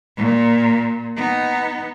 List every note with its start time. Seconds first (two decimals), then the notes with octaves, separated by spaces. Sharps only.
0.17 A#2
1.16 B3 D#4